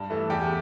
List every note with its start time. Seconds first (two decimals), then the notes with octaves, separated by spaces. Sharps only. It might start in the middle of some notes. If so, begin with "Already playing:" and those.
Already playing: G2
0.10 E3 A3
0.30 E2 G4